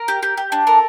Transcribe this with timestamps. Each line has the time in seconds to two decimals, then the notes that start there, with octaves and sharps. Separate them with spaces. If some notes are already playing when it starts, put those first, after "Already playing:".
Already playing: A#4
0.08 G4
0.23 G4
0.37 G4
0.52 D4
0.67 A4 A#4